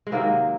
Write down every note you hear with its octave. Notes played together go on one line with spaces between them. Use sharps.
G#3
C3 D#3 F#3 A#3